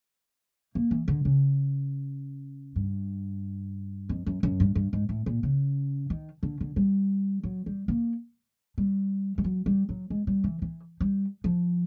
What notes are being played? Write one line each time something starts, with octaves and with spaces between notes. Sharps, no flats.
A#3
E3
D3
C#3
G2
F2
F#2
F#2
G2
G2
G#2
A2
A#2
C#3
D#3
D3
D3
G3
F#3
G3
A#3
G3
G3
F#3
G3
F#3
G#3
G3
E3
E3
G3
F3